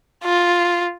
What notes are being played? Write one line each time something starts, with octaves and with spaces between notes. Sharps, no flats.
F4